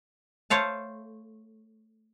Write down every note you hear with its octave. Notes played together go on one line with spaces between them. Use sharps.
A3 C5 C#5 F5 A5